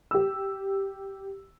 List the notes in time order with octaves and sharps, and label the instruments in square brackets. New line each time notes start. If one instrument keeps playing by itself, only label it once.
[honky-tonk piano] G4 E6